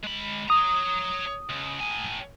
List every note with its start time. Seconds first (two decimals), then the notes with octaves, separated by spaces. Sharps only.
0.03 G#3 B5
0.50 C#5 A#5 D#6
1.49 C#2
1.79 A2 G#5